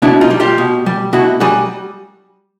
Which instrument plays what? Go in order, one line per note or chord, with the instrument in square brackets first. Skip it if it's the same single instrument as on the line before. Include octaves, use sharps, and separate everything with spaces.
[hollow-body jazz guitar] B2 D4 E4
D#4 F4
G3
F4 G4
B2
G3
B2 E4 F#4
G3 F#4 G#4